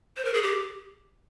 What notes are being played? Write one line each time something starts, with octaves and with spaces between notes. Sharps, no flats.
C5
A#4
G#4
G4